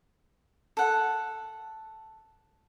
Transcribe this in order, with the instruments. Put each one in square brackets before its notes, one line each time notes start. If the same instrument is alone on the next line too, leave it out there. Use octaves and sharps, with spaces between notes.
[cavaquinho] A4 F#5